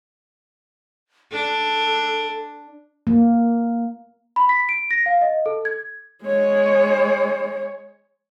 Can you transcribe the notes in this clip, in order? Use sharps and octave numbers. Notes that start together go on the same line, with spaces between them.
D4 A4
A#3
B5
B6
D7
A#6
F5
D#5
A4
G#6
G#3 C#5